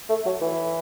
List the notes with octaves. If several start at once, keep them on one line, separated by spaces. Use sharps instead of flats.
A3
F#3
E3